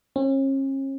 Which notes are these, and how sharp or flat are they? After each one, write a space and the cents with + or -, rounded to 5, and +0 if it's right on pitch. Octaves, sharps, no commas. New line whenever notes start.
C#4 -40